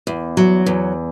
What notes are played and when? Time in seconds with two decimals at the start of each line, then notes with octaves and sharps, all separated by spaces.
0.07 E2
0.37 F#3
0.66 E2